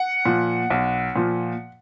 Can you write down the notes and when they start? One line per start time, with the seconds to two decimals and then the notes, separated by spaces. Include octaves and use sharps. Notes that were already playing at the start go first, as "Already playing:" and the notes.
Already playing: F#5
0.26 A#2 F3
0.70 B1
1.16 A#2 F3